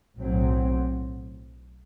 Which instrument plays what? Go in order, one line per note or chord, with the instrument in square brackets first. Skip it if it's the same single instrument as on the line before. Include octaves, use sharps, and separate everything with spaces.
[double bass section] B1 A2 F#3 C4